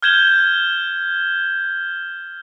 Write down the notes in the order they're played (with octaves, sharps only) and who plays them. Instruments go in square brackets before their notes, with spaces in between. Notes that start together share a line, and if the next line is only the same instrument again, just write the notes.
[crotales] F6 G6 G#6 E7 G7